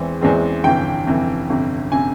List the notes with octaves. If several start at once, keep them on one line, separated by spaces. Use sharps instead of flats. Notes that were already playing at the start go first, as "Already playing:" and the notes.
Already playing: E2 E3 G#3 C4
E2 E3 G#3 C4
G1 F2 C3 E3 G5
G1 F2 C3 E3
G1 F2 C3
C3 G#5